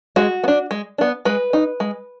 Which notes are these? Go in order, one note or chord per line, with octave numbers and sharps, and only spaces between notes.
G#3 F#4
B3
D4
G#3
B3 D4
G#3 B4
D#4
G#3